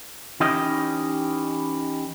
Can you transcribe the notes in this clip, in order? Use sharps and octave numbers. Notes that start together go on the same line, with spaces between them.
E3 C#4 D#4 G4 D#5